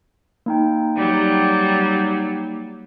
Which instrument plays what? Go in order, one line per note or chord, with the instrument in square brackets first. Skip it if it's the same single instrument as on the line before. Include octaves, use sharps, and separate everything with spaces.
[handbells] A#3 D#4 G5
[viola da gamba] F#3 G3